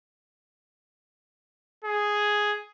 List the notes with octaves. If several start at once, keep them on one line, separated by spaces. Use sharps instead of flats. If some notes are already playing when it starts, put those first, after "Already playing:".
G#4